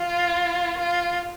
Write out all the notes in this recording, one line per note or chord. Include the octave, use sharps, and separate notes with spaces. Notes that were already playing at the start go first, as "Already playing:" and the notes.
Already playing: F4
F4